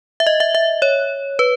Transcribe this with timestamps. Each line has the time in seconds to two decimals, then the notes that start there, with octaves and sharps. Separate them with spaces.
0.20 E5
0.27 D#5
0.40 E5
0.55 E5
0.82 C#5
1.39 B4